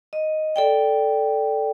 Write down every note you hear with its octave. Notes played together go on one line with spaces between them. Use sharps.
D#5
A4 D5 G5